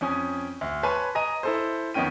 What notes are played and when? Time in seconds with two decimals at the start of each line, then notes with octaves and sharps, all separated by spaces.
0.01 F2 C#4 G#5 D#6
0.61 D2
0.83 B4 C#5 G#5 A5 B5 C6
1.15 D#5 G#5 A#5 D#7
1.43 E4 A4 C5
1.94 F2 D#3 B3 C#4 G5 D#7